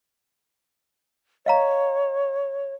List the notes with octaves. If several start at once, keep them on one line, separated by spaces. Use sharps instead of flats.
C#5 D#5 F5 A#5